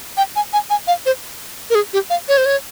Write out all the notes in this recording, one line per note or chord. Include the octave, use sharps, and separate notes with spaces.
G5
G#5
G#5
G#5
F5
C5
A#4
G#4
G4
F5
C#5
C5
C#5